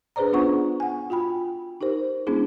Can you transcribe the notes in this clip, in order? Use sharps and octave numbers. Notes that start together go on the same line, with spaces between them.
D4 G#4 B4 C5 D5 A#5
B3 C#4 D4 F4 F#5 C#6
F#5 G#5
F4 F#4 G5 B5
D#4 G4 A#4 C5
G#3 B3 C#4 D4 E4 G#4